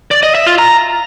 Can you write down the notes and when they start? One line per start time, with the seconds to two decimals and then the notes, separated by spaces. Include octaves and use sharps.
0.11 D5
0.23 D#5
0.35 E5
0.47 F4
0.58 A#5